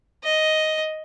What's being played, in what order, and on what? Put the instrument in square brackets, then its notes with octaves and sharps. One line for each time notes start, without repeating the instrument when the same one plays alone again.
[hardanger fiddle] D#5